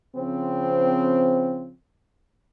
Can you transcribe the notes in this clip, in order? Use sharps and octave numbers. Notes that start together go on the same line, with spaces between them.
C#3 F3 C4